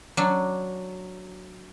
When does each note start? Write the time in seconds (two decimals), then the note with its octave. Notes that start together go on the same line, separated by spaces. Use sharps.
0.17 F#3 D4